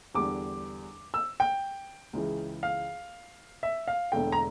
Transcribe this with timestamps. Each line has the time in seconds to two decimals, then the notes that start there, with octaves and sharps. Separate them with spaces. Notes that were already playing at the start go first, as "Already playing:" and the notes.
0.15 E2 D3 G3 D6
1.14 E6
1.40 G5
2.13 C#2 C#3 E3
2.63 F5
3.63 E5
3.88 F5
4.12 E1 E2 D3 A3 G5
4.32 A#5